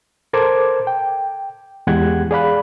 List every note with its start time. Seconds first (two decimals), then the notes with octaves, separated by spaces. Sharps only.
0.33 A4 A#4 C5 A5 D6 G#6
0.87 G5
1.87 E2 G#3 G4 F#5 F#6 G#6
2.31 G#4 D5 F5 B5 F#6